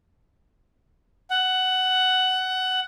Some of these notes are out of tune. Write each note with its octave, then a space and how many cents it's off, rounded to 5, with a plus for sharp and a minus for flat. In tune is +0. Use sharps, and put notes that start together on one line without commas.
F#5 +15